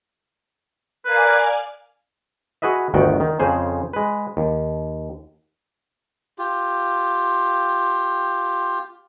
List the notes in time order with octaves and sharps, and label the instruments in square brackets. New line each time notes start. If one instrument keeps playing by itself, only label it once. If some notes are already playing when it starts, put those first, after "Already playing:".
[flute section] A#4 [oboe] B4 [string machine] D5 F5 G#5
[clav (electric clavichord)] F#4 G#4 B4 D#5 E5
G1 D2 D#3 F#4 G5
D#3
F2 C#3 G#4 C5
G#3 B4
D#2
[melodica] F4 G4